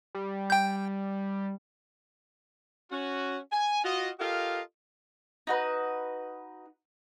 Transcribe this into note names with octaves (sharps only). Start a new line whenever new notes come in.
G3
G5 G6
C#4 F#4
G#5
F4 F#4 D#5
F4 G4 A4 A#4 D#5 F5
D#4 F#4 B4